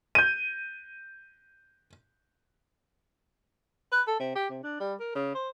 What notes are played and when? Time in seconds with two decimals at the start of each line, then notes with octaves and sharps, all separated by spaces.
0.15 G6 D#7
3.92 B4
4.07 A4
4.20 C3
4.35 G4
4.50 C3
4.63 D4
4.80 G3
5.00 A#4
5.15 C#3
5.35 C5